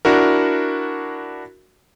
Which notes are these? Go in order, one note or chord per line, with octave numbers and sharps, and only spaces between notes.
D4 E4 F#4 A#4